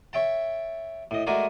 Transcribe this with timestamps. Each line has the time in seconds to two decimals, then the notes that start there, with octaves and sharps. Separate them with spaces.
0.13 C#5 E5 G5 A5
1.11 A2 D#5
1.27 G#3 A3 F#4 A#4 D5 G#5